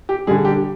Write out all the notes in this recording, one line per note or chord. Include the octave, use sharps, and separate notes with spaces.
G4
D3 G3 G#4
G4